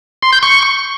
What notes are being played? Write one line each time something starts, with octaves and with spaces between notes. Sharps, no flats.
C6
G6
C#6